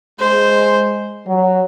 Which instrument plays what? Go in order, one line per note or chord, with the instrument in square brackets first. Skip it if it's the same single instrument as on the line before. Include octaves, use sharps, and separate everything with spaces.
[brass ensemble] G#3 [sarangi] C5
[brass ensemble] F#3